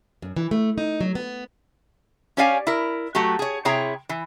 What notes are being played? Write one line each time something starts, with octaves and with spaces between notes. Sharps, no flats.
F#2
E3
A3
D#4
F#3
B3
C#4 G4 C#5 D5 F5 G#5
E4 A#4
F#3 A3 F#4 G4
G#4 C#5
C3 E4 G#4 C#5 G5 A#5
E3